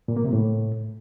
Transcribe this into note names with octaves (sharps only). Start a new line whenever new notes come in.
A#2
A#3
C3
A2